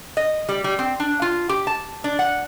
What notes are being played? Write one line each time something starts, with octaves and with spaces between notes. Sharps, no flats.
D#5
G3
G3
C4
D4
F4
G4
A5
D4
F#5